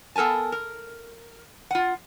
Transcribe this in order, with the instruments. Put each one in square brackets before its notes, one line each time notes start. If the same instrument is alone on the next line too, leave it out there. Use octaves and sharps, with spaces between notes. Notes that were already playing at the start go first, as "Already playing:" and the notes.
[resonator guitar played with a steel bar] B3 A4 A#4 G#5 A5
A#4
F4 F#5